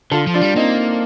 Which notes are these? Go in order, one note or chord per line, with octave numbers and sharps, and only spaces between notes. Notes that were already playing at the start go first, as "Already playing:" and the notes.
D3 F4 A4
F3
D4 F4
G3
A#3 C4 D#4